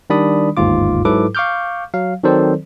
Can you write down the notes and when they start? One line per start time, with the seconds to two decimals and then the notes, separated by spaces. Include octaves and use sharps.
0.10 D#3 G3 D4 D5 B5 D#6
0.57 G1 D#2 G#2 F4 D6
1.05 G#2 F#3 E4 A4 B4 D6
1.35 F5 C#6 D6 F6 G6
1.94 F#3 F5
2.24 D#3 F#3 C4 A4 C5 D5